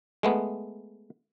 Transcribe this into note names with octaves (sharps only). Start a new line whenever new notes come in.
G#3 A3 B3